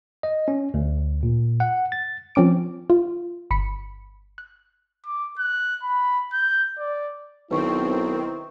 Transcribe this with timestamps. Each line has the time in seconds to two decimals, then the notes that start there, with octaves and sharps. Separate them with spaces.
0.23 D#5
0.48 C#4
0.74 D2
1.23 A#2
1.60 F#5
1.92 A6
2.35 F3 C4 C#4 D6 D7
2.90 F4
3.50 G1 B5 B6 C#7
4.38 F#6
5.06 D6
5.39 F#6
5.83 B5
6.33 G6
6.78 D5
7.51 B1 D#3 C4 E4 B4 C#6